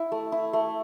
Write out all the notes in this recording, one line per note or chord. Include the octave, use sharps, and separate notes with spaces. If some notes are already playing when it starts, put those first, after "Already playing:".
Already playing: E4
A3
E4
A3